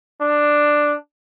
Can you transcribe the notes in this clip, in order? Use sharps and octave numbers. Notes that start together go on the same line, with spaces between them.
D4